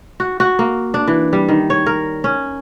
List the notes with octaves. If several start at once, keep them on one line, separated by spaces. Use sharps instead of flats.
F#4
F#4
A#3
D4
E3
G3
D#3
C#5
A#4
C#4